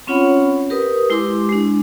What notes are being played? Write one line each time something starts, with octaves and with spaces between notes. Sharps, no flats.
C4 C#4 F4 C#5 F#5 B5
G4 A#4 B4 D#6
G#3 E4 G4 C6 D6
G#3 D4